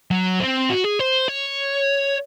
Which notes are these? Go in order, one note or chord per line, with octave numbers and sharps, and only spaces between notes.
F#3
C4
F#4
G#4
C5
C#5